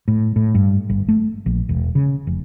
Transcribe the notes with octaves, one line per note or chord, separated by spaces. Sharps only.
A2
A2
G2
G1
A3
A#1
E1
C#3
F1